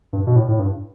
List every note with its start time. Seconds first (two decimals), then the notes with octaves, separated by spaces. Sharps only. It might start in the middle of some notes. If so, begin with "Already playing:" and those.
0.13 G2
0.27 B2
0.36 A2
0.48 A2
0.59 G2